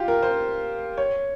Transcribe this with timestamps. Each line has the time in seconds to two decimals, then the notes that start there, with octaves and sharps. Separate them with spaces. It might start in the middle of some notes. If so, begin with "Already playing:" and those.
Already playing: F4 G4
0.08 A#4
0.23 C5
0.98 C#5